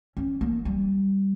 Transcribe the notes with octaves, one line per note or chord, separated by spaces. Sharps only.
C#4
A#3
G3